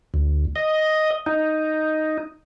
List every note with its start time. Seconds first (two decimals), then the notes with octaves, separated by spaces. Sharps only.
0.14 D2
0.56 D#5
1.26 D#4